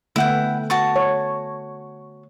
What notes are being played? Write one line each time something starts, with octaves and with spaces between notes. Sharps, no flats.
D3 A3 B3 E4 F#5 G5
F#4 A5 C#6
C#5